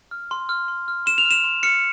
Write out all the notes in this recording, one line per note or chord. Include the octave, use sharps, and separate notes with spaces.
F6
C6
F6
C6
F6
C6 E7
F7
F6
E7
C6
F6 C#7